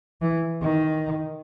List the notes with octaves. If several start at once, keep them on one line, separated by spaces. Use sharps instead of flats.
E3
D#3